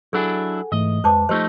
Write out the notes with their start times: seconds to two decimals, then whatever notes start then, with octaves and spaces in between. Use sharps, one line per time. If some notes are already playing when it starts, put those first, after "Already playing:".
0.13 F#3 D4 E4 G#4 A4 F#5 G#5
0.72 G#2 E3 A3 D#5
1.04 F2 G#3 B4 C5 A5 D6
1.29 F3 A3 D#4 G4 C5 D#5